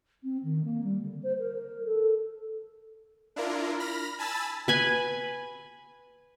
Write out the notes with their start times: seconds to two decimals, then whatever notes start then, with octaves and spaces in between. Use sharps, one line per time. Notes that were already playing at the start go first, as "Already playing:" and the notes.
0.23 C4
0.43 D#3
0.64 A#3
0.83 G3
1.01 D3
1.23 C5
1.39 A#4
1.85 A4
3.36 D4 E4 F4 A#4
3.80 B5 F6 A#6
4.19 G#5 A5 B5 E6 A6
4.68 B4 G#5 B5